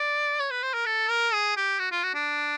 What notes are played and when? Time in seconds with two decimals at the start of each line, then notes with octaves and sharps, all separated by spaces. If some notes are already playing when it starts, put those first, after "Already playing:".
Already playing: D5
0.39 C#5
0.51 B4
0.63 C5
0.74 A#4
0.86 A4
1.09 A#4
1.33 G#4
1.57 G4
1.79 F#4
1.92 F4
2.03 F#4
2.15 D4